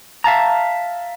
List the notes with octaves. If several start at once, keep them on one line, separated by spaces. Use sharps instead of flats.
E5 F5 A5 A#5